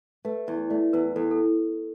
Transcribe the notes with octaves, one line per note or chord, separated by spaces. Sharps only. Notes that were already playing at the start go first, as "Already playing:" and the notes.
A3 B4
E2
A3 D5
E2 B4
E2 A4
A4